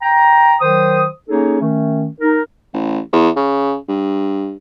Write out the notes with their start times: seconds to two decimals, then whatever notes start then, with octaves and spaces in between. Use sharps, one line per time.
0.02 G5 A#5
0.61 D#3 F#3 C5 D#6
1.29 A#3 C#4 D#4 G#4 A4 C#5
1.60 D#3 A3 C#4
2.21 D#4 A#4
2.73 A1
3.13 E2
3.36 C#3
3.89 G2